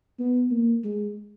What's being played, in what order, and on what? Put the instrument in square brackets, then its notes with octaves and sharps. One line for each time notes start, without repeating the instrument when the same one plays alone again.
[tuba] B3
A#3
G#3